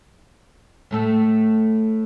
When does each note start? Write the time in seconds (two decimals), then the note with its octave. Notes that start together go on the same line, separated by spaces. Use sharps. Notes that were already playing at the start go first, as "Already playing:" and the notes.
0.91 A2 A3 A4